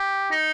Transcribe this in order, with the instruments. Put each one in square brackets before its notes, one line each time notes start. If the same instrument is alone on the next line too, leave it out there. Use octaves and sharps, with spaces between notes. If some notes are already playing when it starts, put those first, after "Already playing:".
Already playing: [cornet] G4
[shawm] D#4